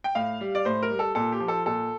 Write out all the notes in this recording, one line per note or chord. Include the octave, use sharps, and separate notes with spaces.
G5
A2 F5
G3
D5
A2 C5
A#4
G3
A4
A#2 A4
G4
F3
A4
A#2 A4